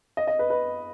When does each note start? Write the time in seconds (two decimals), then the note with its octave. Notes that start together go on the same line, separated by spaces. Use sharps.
0.17 D#5
0.27 D#5
0.39 B4
0.50 B4